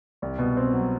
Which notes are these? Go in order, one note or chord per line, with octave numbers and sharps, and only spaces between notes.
C2
B2
C4
F#3